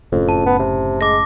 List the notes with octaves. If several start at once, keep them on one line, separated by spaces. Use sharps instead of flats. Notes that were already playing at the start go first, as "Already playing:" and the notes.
F#1 F2 A2 C#3
A5
B3
C3
G#3 D6 A#6